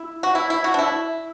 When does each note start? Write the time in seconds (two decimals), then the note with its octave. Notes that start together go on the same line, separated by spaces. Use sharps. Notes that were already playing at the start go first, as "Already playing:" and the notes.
Already playing: E4
0.23 F#4
0.35 E4
0.50 E4
0.64 F#4
0.74 D4
0.79 E4